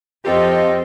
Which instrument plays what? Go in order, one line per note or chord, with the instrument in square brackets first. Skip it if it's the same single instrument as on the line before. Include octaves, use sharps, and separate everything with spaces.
[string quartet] F2 C4 [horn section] F4 G4 A4 [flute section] D#5